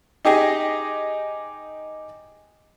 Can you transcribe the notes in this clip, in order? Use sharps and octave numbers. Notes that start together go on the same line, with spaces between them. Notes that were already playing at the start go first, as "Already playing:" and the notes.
D#4 G4 G#4 D#5